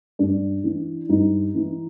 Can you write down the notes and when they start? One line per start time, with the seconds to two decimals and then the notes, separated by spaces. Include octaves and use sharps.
0.19 G2 D4
0.64 E3
1.09 G2 D#4
1.55 E3